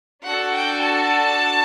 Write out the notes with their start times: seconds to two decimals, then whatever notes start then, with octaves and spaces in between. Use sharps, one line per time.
0.24 D4 F#4 A4 F#5
0.53 G5
0.82 A5